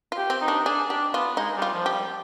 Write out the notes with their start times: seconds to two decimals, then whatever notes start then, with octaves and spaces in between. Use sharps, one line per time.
0.12 F4
0.17 G4
0.30 C4
0.41 D#4
0.48 D4
0.65 D4 G#4
0.89 D4 G4
1.14 B3 F4
1.37 G#3 D#4
1.56 G3
1.62 F4
1.74 F3
1.86 G4
1.92 G3